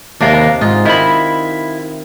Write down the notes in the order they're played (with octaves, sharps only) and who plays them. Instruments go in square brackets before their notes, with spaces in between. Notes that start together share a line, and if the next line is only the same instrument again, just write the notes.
[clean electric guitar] D#2 A#4 F5 [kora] C3 D4
[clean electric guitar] G#2 [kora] D#4 F4
[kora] D#3 [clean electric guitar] E4 B5